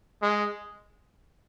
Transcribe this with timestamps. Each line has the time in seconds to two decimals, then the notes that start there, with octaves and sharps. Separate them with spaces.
0.22 G#3